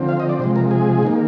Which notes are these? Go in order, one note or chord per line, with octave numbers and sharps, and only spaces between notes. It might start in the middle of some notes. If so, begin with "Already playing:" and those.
Already playing: D3 F3 C4
F5
D#5
D5
C3 F3 G#3 C5
A#4
G#4
D#3 A#3